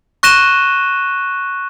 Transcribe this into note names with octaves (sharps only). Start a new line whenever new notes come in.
C#6 F#6 A#6 D#7 E7 G7